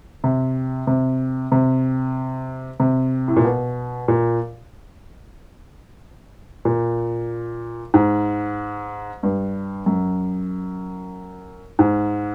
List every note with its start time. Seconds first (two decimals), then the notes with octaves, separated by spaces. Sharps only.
0.24 C3
0.87 C3
1.52 C3
2.80 C3
3.28 A2
3.36 A#2
3.45 B2
4.08 A#2
6.65 A#2
7.94 G#2
9.23 G2
9.86 F#2
11.79 G#2